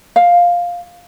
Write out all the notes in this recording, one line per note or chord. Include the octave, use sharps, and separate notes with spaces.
F5